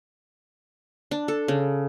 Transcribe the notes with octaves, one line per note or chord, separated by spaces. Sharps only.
D4
A4
C#3